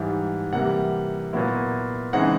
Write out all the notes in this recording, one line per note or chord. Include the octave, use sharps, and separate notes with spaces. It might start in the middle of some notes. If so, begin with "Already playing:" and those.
Already playing: G#2 E3 G3
C3 E3 G3 A#3 F#5
A#2 F#3 B3 E4
C#3 E3 G#3 C4 D#4 F#5